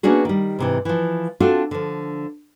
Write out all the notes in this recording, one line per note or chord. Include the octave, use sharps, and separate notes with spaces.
A#3 B3 C#4 D4 F#4 G#4
D#3 G3
G#2 C3 E3
E3 F3
C4 D4 F4 F#4 A4
D3 F3